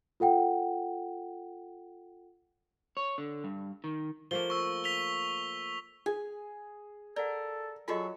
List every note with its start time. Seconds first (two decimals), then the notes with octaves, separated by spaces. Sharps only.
0.20 F4 A4 F#5 G5
2.97 C#5
3.18 D3
3.44 G2
3.84 D#3
4.31 F3 A3 A#3 G7
4.50 C#6 E6
4.84 B6 F7 G7
6.06 G#4 G#5
7.16 A4 A#4 D5 F#5
7.88 F#3 F4 F#4 G#4 A4 D#5 C#6